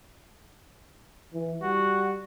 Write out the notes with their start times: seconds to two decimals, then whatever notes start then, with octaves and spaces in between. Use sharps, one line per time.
1.34 E3
1.63 G3 F#4